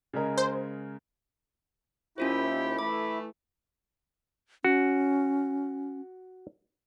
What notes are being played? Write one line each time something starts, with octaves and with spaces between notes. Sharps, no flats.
C#3 G#3 A#4
C5
D#2 C#4 E4 F4 G4 C5
E3 A3 B5 D6
C#4 F#4